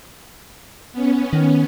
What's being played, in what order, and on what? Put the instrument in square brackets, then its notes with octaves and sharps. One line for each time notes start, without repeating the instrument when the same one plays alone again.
[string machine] B3 C#4
[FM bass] D#3